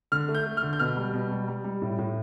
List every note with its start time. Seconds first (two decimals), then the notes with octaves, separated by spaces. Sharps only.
0.12 D3 F6
0.28 A3
0.35 G6
0.46 A3
0.57 F6
0.63 D3
0.73 G6
0.79 B2 F6
0.97 G3
1.14 B2
1.31 G3
1.48 G3
1.64 G3
1.82 A2
1.99 A2